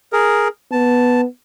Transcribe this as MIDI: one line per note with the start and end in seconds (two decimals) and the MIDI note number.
0.13 0.48 68
0.13 0.48 70
0.72 1.25 59
0.72 1.21 81